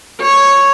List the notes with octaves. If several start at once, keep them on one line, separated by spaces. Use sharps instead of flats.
C#5